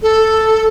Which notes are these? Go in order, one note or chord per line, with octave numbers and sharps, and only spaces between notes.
A4